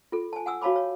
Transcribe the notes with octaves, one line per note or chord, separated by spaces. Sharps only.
F4 A4
G#5 A5
F#5 G#5 D#6 E6
F#4 C#5 F5 A5 B5 D6
C#5